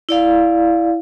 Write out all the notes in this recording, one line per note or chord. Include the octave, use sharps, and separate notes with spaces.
E4 D5 F5